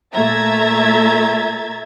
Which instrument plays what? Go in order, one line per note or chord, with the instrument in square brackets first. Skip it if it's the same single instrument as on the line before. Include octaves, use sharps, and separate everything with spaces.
[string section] A#2 A3 E5 A#5 G#6 A6